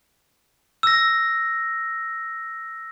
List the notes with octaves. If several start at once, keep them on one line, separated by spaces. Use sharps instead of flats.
E6 A#6